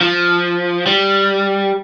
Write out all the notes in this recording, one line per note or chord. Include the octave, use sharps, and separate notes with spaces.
F3
G3